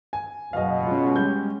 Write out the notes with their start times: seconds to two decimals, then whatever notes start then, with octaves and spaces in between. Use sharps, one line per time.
0.13 G#5
0.53 F#1 B2 D#5 F5
0.84 G#3 C#4 F4
1.15 G3 G6